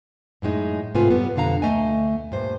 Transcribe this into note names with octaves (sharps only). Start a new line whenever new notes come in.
F#2 A2 G#3 D#4
G#2 C3 A3 F4 B4 G#5
F#2 G3 B3
F2 B2 D3 F5 A#5
D2 A3 D#5 G#5
G2 A#2 C5